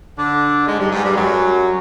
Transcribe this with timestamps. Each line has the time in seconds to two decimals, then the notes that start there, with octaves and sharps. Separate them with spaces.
0.18 D3 D4
0.67 G#2 G#3
0.79 G2 G3
0.91 G#2 G#3
1.04 G2 G3
1.16 F#2 F#3